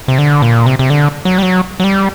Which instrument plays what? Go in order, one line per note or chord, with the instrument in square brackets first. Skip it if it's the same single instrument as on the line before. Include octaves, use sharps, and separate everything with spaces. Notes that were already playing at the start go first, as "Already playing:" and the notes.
[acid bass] C3
D3
A#2
C3
C3
D3
F#3
G3
F#3
F#3
G3